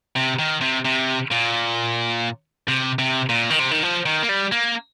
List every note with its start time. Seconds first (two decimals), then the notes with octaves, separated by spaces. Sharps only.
0.16 C3
0.39 D#3
0.62 C3
0.85 C3
1.31 A#2
2.68 C3
2.99 C3
3.29 A#2
3.50 D#3
3.59 C3
3.71 D#3
3.83 F3
4.06 D#3
4.23 A#3
4.29 G3
4.52 A#3